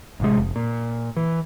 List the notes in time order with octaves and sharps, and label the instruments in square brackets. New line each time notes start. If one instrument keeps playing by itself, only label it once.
[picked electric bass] A1 C3 G#3
F1
A#2
E3